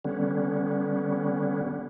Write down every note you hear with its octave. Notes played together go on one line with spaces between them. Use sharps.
D3 G3 B3 C#4